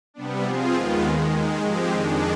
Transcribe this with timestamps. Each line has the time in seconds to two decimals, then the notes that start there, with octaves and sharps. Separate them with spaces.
0.14 C3 G3 B3 D4
0.44 F3 C4 F4 G#4
0.73 D#2 D#3 G#3 B3 F4
1.02 D#2 D#3 G#3
1.32 D#2 D#3 G#3
1.61 G#2 F3 G#3 C4 G4
1.91 F2 D#3 G#3 D4